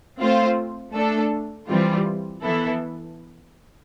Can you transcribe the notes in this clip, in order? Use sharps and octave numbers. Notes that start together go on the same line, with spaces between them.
A3 C4 F4 C5
A3 D4 A4
E3 G3 C4 F4
E3 B3 E4 A4